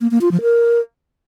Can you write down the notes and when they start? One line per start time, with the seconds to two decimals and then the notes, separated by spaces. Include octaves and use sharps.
0.01 A#3
0.11 A#3
0.21 F4
0.31 F3
0.42 A#4